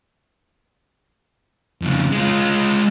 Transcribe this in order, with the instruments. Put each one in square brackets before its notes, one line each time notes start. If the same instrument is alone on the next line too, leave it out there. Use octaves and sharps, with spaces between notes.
[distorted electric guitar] F2 C#3
G#3 F4